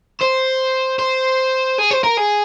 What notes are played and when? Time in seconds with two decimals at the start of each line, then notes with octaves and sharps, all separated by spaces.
0.21 C5
0.99 C5
1.79 G#4
1.91 C5
2.04 A#4
2.17 G#4